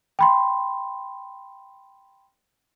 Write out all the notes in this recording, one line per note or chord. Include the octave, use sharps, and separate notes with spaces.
G5 B5 C6